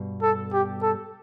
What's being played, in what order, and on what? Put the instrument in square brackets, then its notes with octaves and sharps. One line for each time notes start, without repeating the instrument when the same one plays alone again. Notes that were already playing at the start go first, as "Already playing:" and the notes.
Already playing: [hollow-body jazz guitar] G2 B2
[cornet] A4
G4
A4